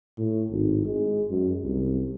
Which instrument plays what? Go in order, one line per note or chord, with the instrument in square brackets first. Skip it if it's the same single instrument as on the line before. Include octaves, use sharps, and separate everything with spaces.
[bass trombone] A2
G#1
G#3
F#2
C2